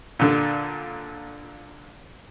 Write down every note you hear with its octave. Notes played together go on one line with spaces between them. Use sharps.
A#2 D3 D4